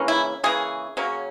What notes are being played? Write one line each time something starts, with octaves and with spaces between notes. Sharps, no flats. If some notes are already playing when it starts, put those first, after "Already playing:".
Already playing: C#3 E3 A#3 C#4
E4
C#3 E3 A#3 C#4 G#4
C#3 F#3 A#3 C#4